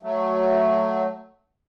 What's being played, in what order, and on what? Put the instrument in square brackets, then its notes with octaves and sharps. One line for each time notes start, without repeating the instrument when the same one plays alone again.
[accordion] F#3 A3